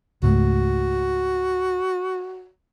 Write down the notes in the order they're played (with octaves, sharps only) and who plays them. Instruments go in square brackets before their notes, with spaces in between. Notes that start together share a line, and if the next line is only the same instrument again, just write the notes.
[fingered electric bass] C#2 G#2 A3 [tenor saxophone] F#4